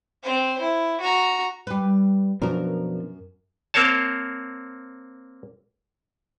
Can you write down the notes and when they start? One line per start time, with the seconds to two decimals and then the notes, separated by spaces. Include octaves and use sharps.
0.23 C4 C5
0.60 E4
1.00 F#4 A#5
1.67 G3 B4
2.42 F#2 B2 F3 D4 A#4
3.74 A#3 C4 A#4 C5 C#5 A5